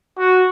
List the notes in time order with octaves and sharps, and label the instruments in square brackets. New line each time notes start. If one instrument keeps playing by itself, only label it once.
[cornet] F#4